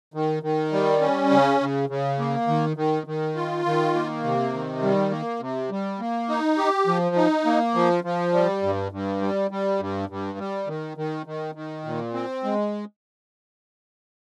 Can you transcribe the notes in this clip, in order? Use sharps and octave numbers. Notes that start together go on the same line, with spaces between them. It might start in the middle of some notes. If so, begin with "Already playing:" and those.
D#3
D#3
G3
C#4
C#3
C#3
C#3
A#3
D#3
D#3
D#3
F4
D#3
A#3
C3
D#3
G3
A#3
C3
G3
A#3
D#4
G4
F3
D#4
A#3
F3
F3
G3
G2
G2
G3
G3
G2
G2
G3
D#3
D#3
D#3
D#3
A#2
C4
G#3